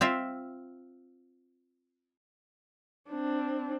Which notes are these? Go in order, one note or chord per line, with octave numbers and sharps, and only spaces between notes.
C4 F4 E5
C4 D4